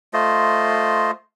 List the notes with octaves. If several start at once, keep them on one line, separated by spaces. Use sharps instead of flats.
A3 F4 C5 D#5